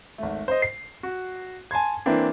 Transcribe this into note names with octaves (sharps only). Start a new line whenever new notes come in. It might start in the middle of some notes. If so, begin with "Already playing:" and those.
G#1 A3
C5 D#5
C7
F#4
G#5 A5 C6 G#6
E3 A#3 C4 D4